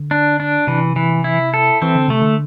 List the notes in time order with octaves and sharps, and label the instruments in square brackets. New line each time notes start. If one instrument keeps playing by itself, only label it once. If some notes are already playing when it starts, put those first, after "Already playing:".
Already playing: [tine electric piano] D3
[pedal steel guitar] D4
D4
[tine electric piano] C3 [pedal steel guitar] E3
[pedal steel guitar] E3
E4
A4
[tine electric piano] E3 [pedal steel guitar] C4
[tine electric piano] D3
[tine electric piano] C3 [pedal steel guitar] A3
[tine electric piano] D3